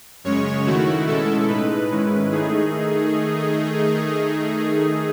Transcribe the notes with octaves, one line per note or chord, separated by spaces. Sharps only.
F#2 C#3 G#3 C#4 C#5
D#3 A3 E4 F#4
B2 G#3 C#4 E4 A4
A2 G#3 D#4 B4
G#2 D#3 G#3 C#4 E4
D#3 A3 D#4 G#4